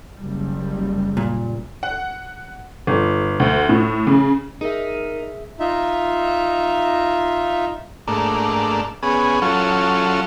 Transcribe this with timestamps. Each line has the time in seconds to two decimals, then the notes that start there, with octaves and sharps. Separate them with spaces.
0.13 F#1 G3
1.17 A#2
1.83 F#5
2.87 G1
3.40 D2
3.69 A2
4.07 C#3
4.61 D#4 G#4 A#4 E5
5.60 D#4 F4 E5
8.07 G#2 A3 A#3 D4
9.03 B3 C#4 G#4
9.42 F#3 C#4 F4 A4